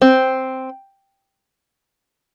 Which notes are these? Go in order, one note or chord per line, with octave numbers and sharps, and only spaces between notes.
C4